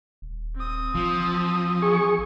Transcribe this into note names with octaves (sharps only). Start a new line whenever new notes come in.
D#1
C4 D#6
A1 F3
G#4 C#6